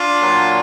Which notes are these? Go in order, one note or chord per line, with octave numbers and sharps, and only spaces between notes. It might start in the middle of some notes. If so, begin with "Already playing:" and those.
Already playing: D4 F4
A#2 F#3